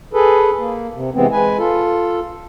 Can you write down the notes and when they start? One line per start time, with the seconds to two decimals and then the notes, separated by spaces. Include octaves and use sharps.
0.13 G#4 A4 B4
0.58 A#3
0.93 C3
1.15 C3 E3 G#3 B3 C4
1.32 G#3 B4 G#5
1.58 F4 A4